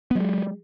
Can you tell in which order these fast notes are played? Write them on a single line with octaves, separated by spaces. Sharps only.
B3 F#3 G#3